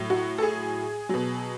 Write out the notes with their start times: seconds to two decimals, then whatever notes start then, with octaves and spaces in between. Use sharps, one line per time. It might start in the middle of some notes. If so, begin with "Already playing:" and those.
Already playing: A2 F#3
0.10 F#4
0.38 A4
0.42 G#4
1.09 B2 F#3